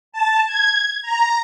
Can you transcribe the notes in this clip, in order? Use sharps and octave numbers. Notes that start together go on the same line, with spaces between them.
A5
G#6
A#5